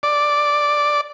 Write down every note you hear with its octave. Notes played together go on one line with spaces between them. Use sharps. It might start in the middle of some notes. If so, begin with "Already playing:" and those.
D5